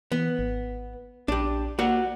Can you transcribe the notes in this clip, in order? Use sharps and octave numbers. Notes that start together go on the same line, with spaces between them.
E3 B3
G#1
A#1 D4 G4
A#3 F#4 D5 F#5